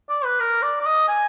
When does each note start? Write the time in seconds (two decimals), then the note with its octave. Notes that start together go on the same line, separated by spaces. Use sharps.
0.09 D5
0.24 B4
0.40 A#4
0.62 D5
0.81 D5
0.86 D#5
1.08 G#5